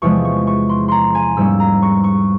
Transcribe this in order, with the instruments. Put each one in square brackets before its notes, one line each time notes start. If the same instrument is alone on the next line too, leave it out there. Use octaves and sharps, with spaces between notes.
[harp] E2 C3 F3 G#3 C#6
C#6
C#6
C6
A#5 C6
G#5
G#2 G3 A#3 C#4 E6
A#5
C#6
C#6